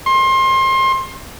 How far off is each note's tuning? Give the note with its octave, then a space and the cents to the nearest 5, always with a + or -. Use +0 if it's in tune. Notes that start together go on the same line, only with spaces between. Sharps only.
C6 +30